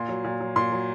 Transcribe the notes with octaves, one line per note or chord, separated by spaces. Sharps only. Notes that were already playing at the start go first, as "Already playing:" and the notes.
Already playing: A#2 C6
F#3
A#2
F#3
A#2 C6
F#3